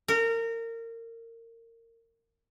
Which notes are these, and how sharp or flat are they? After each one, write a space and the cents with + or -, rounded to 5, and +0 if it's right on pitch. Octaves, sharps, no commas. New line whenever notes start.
A#4 -25